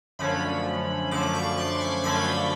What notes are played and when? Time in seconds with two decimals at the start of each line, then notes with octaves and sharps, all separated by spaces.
0.19 F#2 D3 F3 A3 C#4 B5
1.11 F#2 D3 F3 A3 C#4 D6
1.35 C#6
1.57 C6
1.80 B5
2.04 F#2 D3 F3 A3 C#4 B5